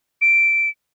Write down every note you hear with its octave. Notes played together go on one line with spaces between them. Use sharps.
D7